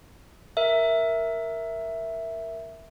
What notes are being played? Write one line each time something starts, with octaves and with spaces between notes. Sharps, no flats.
A#4 E5